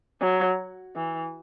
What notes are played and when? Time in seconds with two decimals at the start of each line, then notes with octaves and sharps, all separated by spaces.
0.21 F#3
0.96 E3